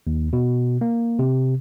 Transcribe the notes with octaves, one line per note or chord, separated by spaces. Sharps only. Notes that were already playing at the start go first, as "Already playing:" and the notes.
D#2
B2
A#3
C3